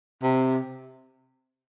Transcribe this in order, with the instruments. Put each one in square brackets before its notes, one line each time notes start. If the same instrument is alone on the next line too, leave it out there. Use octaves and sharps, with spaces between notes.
[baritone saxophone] C3